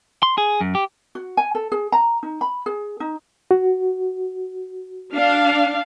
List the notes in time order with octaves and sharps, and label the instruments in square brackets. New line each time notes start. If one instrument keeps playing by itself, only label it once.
[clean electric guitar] C6
G#4
F#2
G4
[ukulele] F#4
G#5
A4
G#4
A#5
D#4
B5
G#4
D#4
[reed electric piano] F#4
[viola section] D4 F5